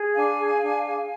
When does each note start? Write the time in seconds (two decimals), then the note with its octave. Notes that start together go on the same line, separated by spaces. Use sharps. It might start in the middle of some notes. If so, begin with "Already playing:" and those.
Already playing: G#4
0.15 D4 F5 G#5
0.39 G#4
0.63 D4
0.86 G#4